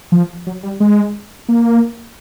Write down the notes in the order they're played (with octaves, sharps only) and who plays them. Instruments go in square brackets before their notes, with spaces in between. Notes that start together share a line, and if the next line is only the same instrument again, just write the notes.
[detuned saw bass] F3
F#3
G3
G#3
A#3